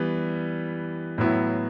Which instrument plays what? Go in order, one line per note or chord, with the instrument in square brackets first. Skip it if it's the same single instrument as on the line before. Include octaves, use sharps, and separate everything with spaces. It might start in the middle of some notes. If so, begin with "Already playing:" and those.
Already playing: [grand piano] E3 G3 B3
A2 F#3 B3 E4